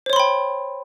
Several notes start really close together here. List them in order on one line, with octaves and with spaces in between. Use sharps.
C5 C#5 C6 B5 G5